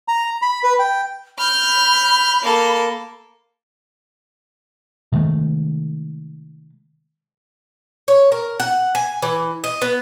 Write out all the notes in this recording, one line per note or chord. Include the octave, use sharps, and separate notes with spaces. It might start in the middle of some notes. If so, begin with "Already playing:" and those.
A#5
B5
B4
G5
B5 F6 G6
A#3 A4
C3 D#3 G#3 A3
C#5
A#4
F#5
G#5
E3
D#5
B3